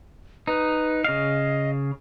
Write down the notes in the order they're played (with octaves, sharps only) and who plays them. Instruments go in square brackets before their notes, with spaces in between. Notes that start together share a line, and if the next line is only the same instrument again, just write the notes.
[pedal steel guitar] D#4 [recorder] B4
[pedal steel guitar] C#3 F5 [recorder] D#5